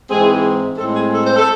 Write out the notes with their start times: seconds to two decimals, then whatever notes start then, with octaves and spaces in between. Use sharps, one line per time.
0.09 G#2 E3 G#3 C4 G#4
0.77 A2 G#3 C4 A4
0.94 G#4
1.10 A4
1.24 C5
1.36 A4